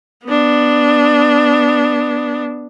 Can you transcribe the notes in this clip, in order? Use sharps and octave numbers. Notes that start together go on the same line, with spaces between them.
B3 D4